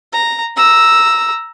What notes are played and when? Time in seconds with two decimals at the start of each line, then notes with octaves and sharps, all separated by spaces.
0.12 A#5
0.56 A#5 E6